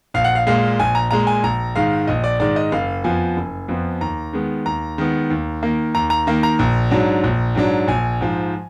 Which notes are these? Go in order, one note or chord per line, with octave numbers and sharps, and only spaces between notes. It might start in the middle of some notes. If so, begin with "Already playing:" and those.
A#1 F5
F#5
F5
A#2 G#3 F5
A#1 G#5
A#5
A#2 G#3 A#5
G#5
A#1 A#5
G#2 D#3 G#3 F5
A#1 D#5
D5
G#2 D#3 G#3 D5
D#5
F#1 F5
F2 F3 B3 G#5
F#1
F2 F3 B3
D#2 A#5
D#3 G#3 B3
D#2 A#5
D#3 G#3 B3
D#2
D#3 A#3
D#2 A#5
A#5
D#3 A#3
A#5
A#1
G#2 F#3 D4
A#1
G#2 F#3 D4
A#1 G#5
G#2 F3